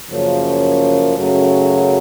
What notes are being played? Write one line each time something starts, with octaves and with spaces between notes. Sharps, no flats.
F#2 C#3 F3 A#3 C#4
F#2 C#3 F#3 A3 C#4